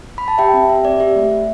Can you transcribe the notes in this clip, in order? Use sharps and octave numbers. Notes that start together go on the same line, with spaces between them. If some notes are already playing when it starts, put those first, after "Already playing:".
B5
A5
G4 E5 G5
C4
G4 E5
C4 D5
G4 E5
A3
A3